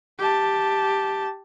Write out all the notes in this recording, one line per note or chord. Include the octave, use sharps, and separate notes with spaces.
G4 A5